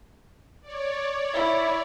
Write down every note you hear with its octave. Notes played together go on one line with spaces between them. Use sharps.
C#5 D5
E4